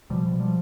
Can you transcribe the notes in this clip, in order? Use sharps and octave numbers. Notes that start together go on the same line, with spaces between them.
B2 F3 G3
B2
F3 G3